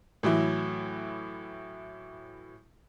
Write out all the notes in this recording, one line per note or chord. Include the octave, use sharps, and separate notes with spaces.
A2 E3 F#3 E4